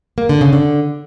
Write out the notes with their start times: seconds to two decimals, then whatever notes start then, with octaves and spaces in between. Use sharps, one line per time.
0.18 A#3
0.29 D3
0.41 C#3
0.53 D3